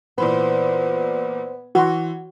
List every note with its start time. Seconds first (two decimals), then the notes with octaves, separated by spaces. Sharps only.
0.18 A#2 E3 B3 C5 B5
1.75 E3 F#4 C6